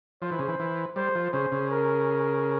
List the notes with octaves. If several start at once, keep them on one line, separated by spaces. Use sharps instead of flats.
F3 C5
E3
C#3
E3
E3
G3 C5
F3
C#3 C5
C#3
A#4